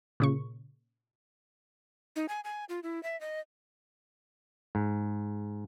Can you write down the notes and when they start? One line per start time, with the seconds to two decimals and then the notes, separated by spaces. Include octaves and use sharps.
0.20 A#2 C#3 C#6
2.16 D#4
2.29 G#5
2.44 G#5
2.69 F4
2.83 E4
3.03 E5
3.21 D#5
4.75 G#2